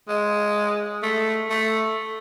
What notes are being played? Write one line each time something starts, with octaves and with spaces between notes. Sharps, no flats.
G#3
A3
A3